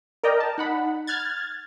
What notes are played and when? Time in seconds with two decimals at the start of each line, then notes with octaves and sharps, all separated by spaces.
0.24 A#4 D5 D#5 G5 A#5
0.40 A5
0.58 D#4 F#5 B5
1.07 F6 F#6 G#6 A6